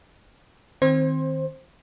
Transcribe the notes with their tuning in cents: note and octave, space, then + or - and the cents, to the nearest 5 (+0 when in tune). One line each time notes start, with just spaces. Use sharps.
D#3 +0 C4 +0 C5 +15